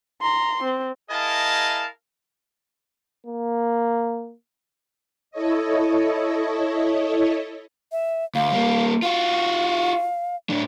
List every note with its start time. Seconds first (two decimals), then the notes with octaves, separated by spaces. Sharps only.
0.22 A#5 C6
0.63 C4
1.10 E4 G#4 A#4 D#5 F5 A5
3.27 A#3
5.31 E4 A4 C#5 D#5
7.92 E5
8.35 D2 F5
8.52 G3 A#3
9.02 F4 F#4 F5
10.50 A2 D4